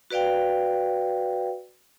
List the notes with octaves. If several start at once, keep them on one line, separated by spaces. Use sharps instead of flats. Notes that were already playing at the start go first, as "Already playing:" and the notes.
F#4 B4 D5 F5 G5